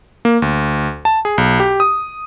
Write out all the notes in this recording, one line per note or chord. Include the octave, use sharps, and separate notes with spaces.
A#3
D2
A5
G#4
B1
G4
D#6